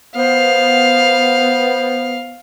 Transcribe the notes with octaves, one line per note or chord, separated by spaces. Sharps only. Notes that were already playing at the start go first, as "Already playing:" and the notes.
B3 C5 F5